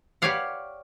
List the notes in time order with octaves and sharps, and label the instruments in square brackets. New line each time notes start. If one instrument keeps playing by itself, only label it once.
[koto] G4 B4 C#5 D5 F5 F#5